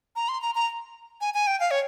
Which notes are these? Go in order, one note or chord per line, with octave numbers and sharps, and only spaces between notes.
A#5
C6
A#5
A#5
G#5
G#5
G5
F5
C#5